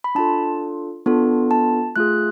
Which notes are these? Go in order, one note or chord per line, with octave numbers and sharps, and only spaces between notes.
B5
D4 F4 A4 A5
B3 D4 F4 A4
A5
A3 F4 G#4 F#6